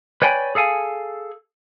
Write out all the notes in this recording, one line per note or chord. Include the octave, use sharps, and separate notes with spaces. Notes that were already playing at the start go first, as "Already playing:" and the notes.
B4 C#5 D5 G5 G#5 B5
G#4 A4 F5 G#5